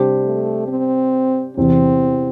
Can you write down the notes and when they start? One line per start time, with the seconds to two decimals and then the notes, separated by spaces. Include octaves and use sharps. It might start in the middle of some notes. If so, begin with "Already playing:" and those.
Already playing: C3 G3 D4 G4 C5
0.24 A3
0.68 C4
1.57 E2 C3 E3 C4